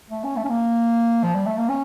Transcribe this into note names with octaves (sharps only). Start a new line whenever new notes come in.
A3
C#4
A3
C#4
A#3
F3
G3
A3
A#3
C#4